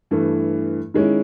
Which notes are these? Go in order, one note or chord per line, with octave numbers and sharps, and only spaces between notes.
G2 E3 A3
D#3 G#3 C#4 E4